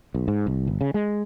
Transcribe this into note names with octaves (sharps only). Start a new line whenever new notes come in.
B1
G#2
C2
G1
C#3
G#3